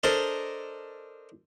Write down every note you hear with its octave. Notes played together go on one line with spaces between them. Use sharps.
D4 A4 A#4 C5 D#5